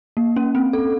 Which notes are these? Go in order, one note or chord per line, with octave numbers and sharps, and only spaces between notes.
A#3
C#4
C4
A4